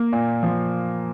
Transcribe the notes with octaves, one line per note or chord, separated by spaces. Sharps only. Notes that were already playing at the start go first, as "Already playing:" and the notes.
Already playing: A#3
A#2
F3